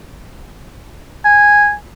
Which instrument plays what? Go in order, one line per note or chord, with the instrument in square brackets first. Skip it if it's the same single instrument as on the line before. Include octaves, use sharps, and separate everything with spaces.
[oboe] G#5